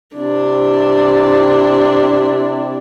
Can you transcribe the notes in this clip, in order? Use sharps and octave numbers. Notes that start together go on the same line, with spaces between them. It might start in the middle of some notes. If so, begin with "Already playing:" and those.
C3 D4 E4